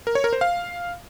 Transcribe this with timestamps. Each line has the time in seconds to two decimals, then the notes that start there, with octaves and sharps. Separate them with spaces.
0.07 A#4
0.15 C#5
0.24 A#4
0.33 C5
0.41 F5